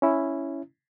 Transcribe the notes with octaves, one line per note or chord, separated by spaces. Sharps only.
C#4 E4